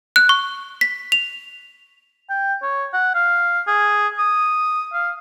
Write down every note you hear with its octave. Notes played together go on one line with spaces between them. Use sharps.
F#6
C#6
B6
F7
G5
C#5
F#5
F5
G#4
D#6
F5